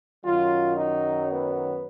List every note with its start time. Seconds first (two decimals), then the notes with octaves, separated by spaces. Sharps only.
0.24 F#2 D#3 F#3 F4
0.76 D#4
1.28 B3